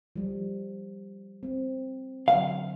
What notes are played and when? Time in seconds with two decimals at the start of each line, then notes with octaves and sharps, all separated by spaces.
0.16 F3 G3
1.43 C4
2.28 D3 F#3 F5